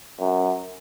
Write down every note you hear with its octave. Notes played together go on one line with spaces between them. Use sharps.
F#2